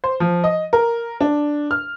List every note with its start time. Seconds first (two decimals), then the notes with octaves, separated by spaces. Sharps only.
0.04 C5
0.20 F3
0.44 D#5
0.73 A#4
1.21 D4
1.71 F6